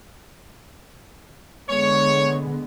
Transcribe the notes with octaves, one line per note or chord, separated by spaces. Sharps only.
D3 G#3 B3 C#5